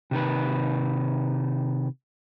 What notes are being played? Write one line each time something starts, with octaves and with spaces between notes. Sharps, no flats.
C3 D#3 B4